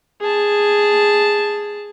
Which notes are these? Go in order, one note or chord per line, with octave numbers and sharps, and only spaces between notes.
G#4 A5